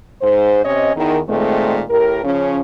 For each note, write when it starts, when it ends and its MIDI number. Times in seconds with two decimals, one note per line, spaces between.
0.22 0.63 44
0.22 0.63 72
0.64 0.92 48
0.64 0.92 61
0.64 0.92 73
0.64 0.92 75
0.96 1.19 40
0.96 1.19 51
1.28 1.82 46
1.28 1.82 51
1.28 1.82 56
1.28 1.82 57
1.28 1.82 60
1.89 2.22 45
1.89 2.22 67
1.89 2.22 70
2.24 2.60 49
2.24 2.60 53
2.24 2.60 61